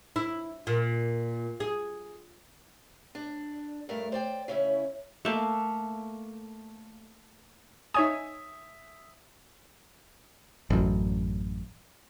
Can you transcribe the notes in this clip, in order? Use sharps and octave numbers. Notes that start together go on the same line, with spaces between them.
E4
A#2
G#4
D4
G2 A3 A#4
C5 D5 G5
C#3 C#4 E4
A3 A#3
D#4 C#5 E5 G#5 D#6
A1 F#2